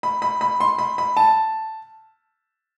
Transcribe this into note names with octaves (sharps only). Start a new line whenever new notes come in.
B5
B5
B5
C6
B5
B5
A5